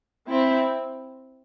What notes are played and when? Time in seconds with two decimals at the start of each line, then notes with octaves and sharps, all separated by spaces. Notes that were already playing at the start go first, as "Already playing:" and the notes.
0.29 C4 E4